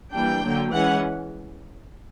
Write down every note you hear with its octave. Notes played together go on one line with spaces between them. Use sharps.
E3 G3 A#3 D4 G5
D3 F#3 A#3
E3 G#3 C#4 F#5